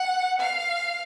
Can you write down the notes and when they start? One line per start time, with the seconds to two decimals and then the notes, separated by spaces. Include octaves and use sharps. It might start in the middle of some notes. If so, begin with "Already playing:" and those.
Already playing: F#5
0.40 F5